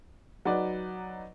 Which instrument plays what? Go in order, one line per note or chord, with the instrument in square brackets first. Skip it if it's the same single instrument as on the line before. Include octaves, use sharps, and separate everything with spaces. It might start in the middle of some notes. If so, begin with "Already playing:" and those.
[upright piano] F#3 D#4 B4 D5